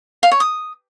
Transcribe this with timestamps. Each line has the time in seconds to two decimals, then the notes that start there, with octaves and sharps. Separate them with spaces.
0.23 F5
0.32 C#5
0.40 D#6